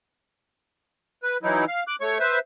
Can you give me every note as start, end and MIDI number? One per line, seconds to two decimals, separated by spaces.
1.23 1.37 71
1.43 1.65 52
1.43 1.65 54
1.43 1.65 63
1.43 1.65 64
1.68 1.83 77
1.88 1.96 86
1.88 1.96 90
2.01 2.18 57
2.01 2.18 73
2.01 2.18 85
2.20 2.39 71
2.20 2.39 72
2.20 2.39 76